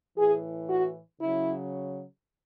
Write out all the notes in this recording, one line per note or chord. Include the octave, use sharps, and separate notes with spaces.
A2 E3 G#4
F#4
C#3 F#3 E4